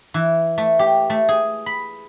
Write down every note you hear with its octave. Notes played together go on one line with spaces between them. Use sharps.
E3
A3
G4
A3
G#4
B5